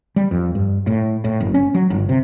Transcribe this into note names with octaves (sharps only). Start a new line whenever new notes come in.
G3
F2
G2
A2
A2
F#1
C#4
F#3
G1
C3